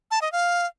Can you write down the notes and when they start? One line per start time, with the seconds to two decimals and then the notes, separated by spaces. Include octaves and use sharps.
0.11 A5
0.22 D#5
0.32 F5